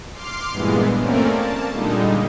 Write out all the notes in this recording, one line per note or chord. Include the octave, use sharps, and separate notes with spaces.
C6 D6 F6 C7
G2 A#2 E3 G#3 B3
A3 A#3 C4 C#4 A#4 D5
A#3 A5
A#2 D3 G3 G#3 D#4